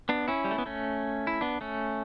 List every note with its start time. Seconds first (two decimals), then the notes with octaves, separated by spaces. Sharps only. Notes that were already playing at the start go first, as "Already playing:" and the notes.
0.09 B3 D4
0.28 C#4 E4
0.44 G3
0.51 A3
0.58 B3
0.66 A3 C#4
1.27 E4
1.41 B3 D4
1.61 A3 C#4